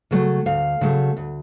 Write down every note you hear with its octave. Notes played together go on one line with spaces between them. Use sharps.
C#3 F#3 A3
D2 F5
C#3 F#3 A3
D2